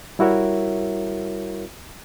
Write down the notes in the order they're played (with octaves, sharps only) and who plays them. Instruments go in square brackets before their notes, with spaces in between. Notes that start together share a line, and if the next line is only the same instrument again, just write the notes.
[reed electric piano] G3 E4 F#4 A#4 C#5 E5